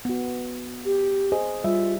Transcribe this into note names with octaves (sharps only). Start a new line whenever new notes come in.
B3 F#4
G4
G#4 C5 D#5
G3 F4 E5